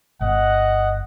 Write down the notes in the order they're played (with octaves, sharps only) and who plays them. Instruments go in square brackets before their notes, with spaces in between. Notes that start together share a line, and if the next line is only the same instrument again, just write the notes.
[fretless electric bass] G1 [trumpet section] D#5 F#5